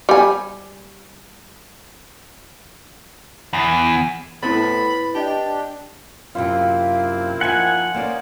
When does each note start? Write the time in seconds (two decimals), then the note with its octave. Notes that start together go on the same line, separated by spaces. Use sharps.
0.09 G3 G#5
3.53 E2
4.43 A2 B3 C4 E4 B5 A6
5.15 D4 G4 D#5 A5
6.35 F#2 C3 A#3 C4 E4 F4
7.41 F3 D#4 F#5 G#5
7.94 A#3 C#4 D#4 C5 D5